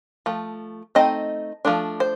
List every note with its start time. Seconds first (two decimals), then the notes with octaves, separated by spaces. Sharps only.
0.26 F3 A3
0.95 A3 C4 D#4 D#5
1.65 F3 A3 D4
2.00 C5